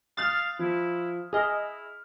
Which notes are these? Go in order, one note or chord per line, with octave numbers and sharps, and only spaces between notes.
F5 D#6 F6 F#6 A6
F3 E4
E4 G#4 D#5 F6